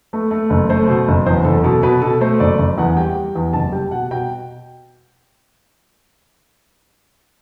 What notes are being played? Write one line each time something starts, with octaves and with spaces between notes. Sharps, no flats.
A3 B4
A3
F#1
A3 C5
B2
F#1
E2 C5
F#1 A4
B2 A4
B2 B4
B2 A4
A3 C5
F#1 D5
F#1
E2 F#5
G3 G5
G3
E2
F#1 A5
G3 G5
B2 F#5
B2 G5